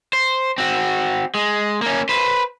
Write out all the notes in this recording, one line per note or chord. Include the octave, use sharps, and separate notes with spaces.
C5
C4 F#4
G#3
A#3 C#4
B4 C5